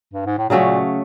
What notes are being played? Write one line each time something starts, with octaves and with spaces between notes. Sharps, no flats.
G2
G#2
A2
A#2 C#3 F#3 A3 C#4